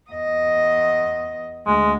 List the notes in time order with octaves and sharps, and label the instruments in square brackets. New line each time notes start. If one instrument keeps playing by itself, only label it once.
[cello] E2 D#5
[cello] D2 [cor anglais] G#3